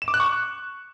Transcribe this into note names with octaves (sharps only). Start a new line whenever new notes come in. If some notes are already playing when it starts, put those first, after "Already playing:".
E7
D6
F#6
C#6